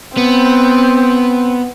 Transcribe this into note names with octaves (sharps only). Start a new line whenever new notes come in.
B3 C4